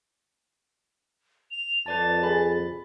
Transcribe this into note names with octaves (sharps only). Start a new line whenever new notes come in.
F7
F2 B4 D5 A5 A6
G#4 B5